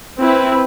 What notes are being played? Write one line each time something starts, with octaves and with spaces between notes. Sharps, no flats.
C4 E4 B4